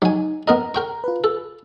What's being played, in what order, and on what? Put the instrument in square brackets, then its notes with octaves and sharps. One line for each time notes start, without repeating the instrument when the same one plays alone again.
[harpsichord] F#3 G#5 [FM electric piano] D#4
[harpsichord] B3 A#4 D#5 [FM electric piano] A#5
[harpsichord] A#4 G5 C#6
[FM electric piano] F4 B4
[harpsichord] A4